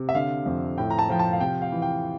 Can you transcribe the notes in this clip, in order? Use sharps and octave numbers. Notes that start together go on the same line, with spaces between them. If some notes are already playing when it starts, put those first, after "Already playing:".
Already playing: C3
E5
D3 F5
F2
A2 G5
A#5
A5
F3 G5
A5
F5
C3 G5
F5
E3
G5